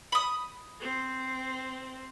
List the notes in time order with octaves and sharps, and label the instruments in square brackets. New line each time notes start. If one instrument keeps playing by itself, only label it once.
[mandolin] B5 D#6
[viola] C4